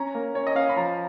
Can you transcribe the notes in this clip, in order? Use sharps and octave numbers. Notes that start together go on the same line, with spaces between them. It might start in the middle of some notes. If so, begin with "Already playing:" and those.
Already playing: C#4 A#5
A#3
C#4 C#5
D#5
C#4 F5
B5
F3 A#5